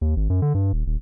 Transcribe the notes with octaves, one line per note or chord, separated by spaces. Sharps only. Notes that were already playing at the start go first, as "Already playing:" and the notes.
D#2
G#1
F#2
D3
G2
D#1
D#1